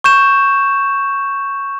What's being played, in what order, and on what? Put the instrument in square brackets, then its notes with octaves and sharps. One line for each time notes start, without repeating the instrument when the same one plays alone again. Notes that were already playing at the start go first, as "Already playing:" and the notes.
[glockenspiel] C#6 G6 E7